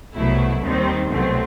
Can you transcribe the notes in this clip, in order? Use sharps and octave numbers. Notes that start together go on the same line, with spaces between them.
C2 B2 F#3 A3 E4
D#2 D#3 G3 C4
C2 B2 F#3 A3 C4